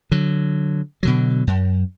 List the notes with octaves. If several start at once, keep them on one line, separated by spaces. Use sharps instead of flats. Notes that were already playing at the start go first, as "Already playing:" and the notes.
D3 F#3
B2 D3 F#3
F#2